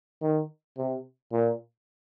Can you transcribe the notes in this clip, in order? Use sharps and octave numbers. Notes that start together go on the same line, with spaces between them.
D#3
C3
A#2